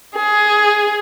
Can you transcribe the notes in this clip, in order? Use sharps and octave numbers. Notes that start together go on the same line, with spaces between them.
G#4